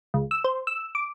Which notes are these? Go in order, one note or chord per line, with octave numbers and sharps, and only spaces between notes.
C#2
E6
C5
E6
D6